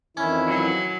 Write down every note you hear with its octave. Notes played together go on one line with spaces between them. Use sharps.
F2 D#3 E3 C#4 E4
F#3